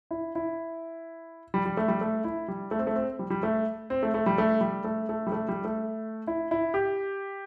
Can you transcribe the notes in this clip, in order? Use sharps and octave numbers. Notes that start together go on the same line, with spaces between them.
E4
E4
G3
G3
A3
G3
A3
E4
G3
A3
C4
A3
C4
G3
G3
A3
C4
A3
A3
G3
A3
G3
A3
A3
G3
A3
G3
A3
E4
E4
G4